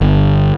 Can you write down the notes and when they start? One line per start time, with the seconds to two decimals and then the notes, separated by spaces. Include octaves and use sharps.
0.01 G1